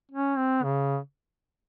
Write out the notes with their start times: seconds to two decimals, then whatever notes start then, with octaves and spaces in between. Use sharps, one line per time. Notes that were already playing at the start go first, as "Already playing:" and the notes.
0.12 C#4
0.38 C4
0.64 C#3